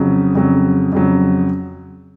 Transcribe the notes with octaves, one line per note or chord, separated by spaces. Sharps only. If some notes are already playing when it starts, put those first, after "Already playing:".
Already playing: F2 C#3 F#3
F2 C#3 F#3
F2 C#3 F#3